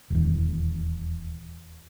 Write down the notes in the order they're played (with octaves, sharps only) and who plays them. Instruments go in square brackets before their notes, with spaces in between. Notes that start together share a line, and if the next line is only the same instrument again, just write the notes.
[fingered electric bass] D#1 E2